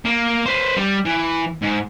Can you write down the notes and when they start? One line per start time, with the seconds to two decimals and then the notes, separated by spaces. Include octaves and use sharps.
0.05 A#3
0.46 B4 C5
0.76 G3
1.05 E3
1.62 G#2